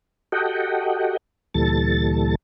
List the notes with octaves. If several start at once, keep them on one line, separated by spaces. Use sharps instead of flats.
F#4 G4 A4 D#5 F#5 G5
D2 A#2 E3 G3 A4 A6